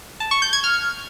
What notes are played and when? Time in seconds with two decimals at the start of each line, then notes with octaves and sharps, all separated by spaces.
0.20 A5
0.31 C#6
0.42 G6
0.53 G#6
0.64 F6